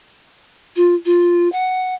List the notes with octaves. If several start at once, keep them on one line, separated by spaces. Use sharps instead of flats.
F4
F4
F#5